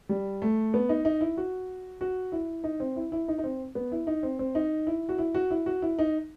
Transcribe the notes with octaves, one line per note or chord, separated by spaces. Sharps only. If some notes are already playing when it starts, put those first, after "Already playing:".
G3
A3
B3
D#4
D#4
E4
F#4
F#4
E4
D#4
C4
E4
E4
D#4
D#4
C4
B3
E4
D#4
C4
C4
D#4
E4
F#4
E4
F#4
E4
F#4
E4
D#4